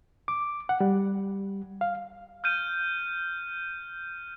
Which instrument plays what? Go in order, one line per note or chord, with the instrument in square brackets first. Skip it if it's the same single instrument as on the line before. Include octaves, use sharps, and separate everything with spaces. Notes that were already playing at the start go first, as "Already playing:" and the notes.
[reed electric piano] D6
F#5
G3
F5
[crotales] F6 G6 D#7